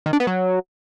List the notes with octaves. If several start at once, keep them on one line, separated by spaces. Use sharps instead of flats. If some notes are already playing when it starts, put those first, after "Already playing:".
D#3
D4
B3
F#3